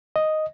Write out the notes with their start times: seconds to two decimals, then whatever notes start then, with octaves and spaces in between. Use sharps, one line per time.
0.16 D#5